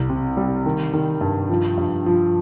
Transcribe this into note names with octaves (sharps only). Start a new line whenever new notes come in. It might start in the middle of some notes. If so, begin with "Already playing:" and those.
Already playing: C2
C3
G3
D#3
D#3
G2
F3
G2
F3